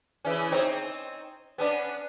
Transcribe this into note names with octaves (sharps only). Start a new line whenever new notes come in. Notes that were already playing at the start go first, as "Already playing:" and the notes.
C#3 E3 C#4
C4 D#4 C#5
B3 C#4 D4